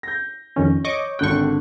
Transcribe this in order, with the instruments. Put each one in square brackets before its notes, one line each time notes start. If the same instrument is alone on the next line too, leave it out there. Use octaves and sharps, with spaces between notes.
[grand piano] G6 A#6
[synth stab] F2 D#3 C#4
[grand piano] C#5 [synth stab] D#5 C#6 D6
[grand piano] G#1 D3 F#6 [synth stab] G5 C#6